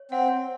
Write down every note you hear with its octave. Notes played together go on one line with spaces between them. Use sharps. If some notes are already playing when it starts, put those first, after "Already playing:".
Already playing: C#5
C4 F#5